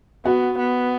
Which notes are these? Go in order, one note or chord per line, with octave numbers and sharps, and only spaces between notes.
B3 F#4
B3